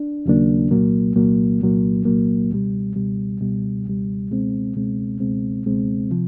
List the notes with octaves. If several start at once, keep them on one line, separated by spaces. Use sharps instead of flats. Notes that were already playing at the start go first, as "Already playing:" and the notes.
Already playing: D4
D#2 C#3 F#3 A#3 D4
C2 A#2 F#3 A#3
C2 A#2 F#3 A#3
C2 A#2 F#3 A#3
C2 A#2 F#3 A#3
C#2 B2 G3
C#2 B2 G3
C#2 B2 G3
C#2 B2 G3
C#2 B2 G#3 C4
C#2 B2 G#3 C4
C#2 B2 G#3 C4
C#2 B2 G#3 C4
C3 F3